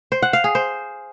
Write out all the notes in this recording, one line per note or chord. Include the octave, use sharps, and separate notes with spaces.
C5
F#5
F5
G#4
C5